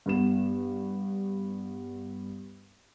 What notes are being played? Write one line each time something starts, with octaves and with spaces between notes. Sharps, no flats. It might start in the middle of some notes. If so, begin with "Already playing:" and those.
G2 B3 E7